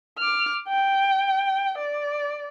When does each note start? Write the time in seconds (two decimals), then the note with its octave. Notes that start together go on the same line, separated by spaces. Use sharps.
0.18 D6 F6
0.68 G5
1.78 D5